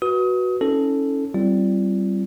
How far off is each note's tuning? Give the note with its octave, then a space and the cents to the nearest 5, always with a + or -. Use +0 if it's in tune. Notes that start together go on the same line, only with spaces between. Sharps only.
F#4 +0 B4 -15 D#6 +30
C#4 +0 E4 -40 A4 +0
G3 -15 C4 +0 F4 -45